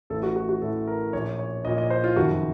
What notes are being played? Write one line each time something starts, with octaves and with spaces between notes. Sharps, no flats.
A1 A2 A4
F#4
F#4
F#4
A1 A2 A4
A#4
A#1 A#2 C#5
C#5
A#1 A#2 D#5
D#5
C5
F4
F#1 F2 D#3 F#4